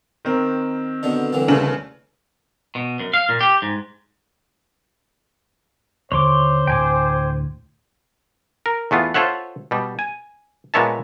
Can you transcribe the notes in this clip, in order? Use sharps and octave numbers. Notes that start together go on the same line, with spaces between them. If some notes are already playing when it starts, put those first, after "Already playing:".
D#3 C4 A#4
B2 D3
C2 D3 E3
D#2 C#3 A3 F#7
B2
F#2
F5
A#2
G4
G#2
D#2 D3 C5 C#5 C6 D6
D2 A2 G5 G#5 D6
A#4
E2 A3 B3 F4
F4 A4 C5 C#5 E5 F#5
B2 G3
G#5
A#2 G#3 B3 C#5 E5 A5